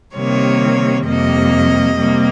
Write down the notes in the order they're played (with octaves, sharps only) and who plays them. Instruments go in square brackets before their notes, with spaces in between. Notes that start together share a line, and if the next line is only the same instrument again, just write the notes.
[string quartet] C3 D#3 G3 A#3 C#5
F2 C3 G3 A#3 D#5
C3 G3 A#3